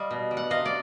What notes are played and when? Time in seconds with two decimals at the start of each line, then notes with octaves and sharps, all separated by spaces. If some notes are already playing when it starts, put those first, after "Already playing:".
Already playing: G3 D#5 F5
0.11 B2
0.31 G3
0.37 F#5
0.50 C3 D#5 F5
0.65 D5